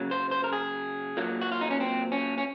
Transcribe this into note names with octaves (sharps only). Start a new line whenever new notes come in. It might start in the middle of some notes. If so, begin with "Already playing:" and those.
Already playing: C#3 F#3 A#3
C5
C5
A#4
G#4
A#2 F#3 A#3
F#4
F4
D#4
C#4
C4
C#4
C#4